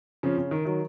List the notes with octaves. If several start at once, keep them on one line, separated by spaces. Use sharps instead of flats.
C#3 F3
C#3
D#3
D#3 F#3